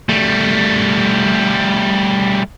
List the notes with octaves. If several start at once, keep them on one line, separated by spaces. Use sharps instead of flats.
G3 A3